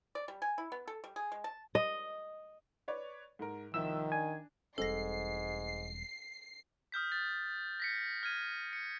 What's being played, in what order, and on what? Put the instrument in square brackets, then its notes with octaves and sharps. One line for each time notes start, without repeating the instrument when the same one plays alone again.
[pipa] D5
G3
G#5
E4
B3
A4
G3
G#4
G#3
A5
[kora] D#5
[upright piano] B4 C#5 D5
G#2 A#4
[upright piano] C2 F3 E5 [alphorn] D#3 [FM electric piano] E6
[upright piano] D4 [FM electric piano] G#5
[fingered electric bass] E1 G3 C4 [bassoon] G#2 [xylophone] A4 A#6 [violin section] C7
[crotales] D#6 F6 G6 B6
A6
A#6 B6 C#7
F6 G#6 D#7
C#7